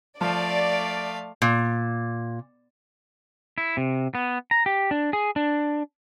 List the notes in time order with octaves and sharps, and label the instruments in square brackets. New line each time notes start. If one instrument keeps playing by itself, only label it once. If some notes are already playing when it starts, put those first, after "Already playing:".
[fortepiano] F3 [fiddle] A3 F5 [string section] D5
[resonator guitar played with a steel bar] A#2
[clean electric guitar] E4
C3
B3
A#5
G4
D4
G#4
D4